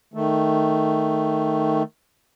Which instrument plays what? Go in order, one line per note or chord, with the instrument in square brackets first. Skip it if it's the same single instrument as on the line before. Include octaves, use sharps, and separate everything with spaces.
[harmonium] D#3 A3